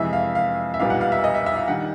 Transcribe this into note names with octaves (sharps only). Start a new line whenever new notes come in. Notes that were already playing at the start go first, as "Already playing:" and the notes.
Already playing: F2 C3 E3 G#3 E5
F5
F5
E5
B1 A#2 G3 B3 F5
F#5
F5
E5
D#5
E5
E5
F5
D#3 G3 F#5